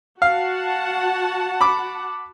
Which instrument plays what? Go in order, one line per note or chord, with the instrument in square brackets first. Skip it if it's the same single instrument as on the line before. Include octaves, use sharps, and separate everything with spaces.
[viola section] F#4 F#5 A5 [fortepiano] F5
[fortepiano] B5 D6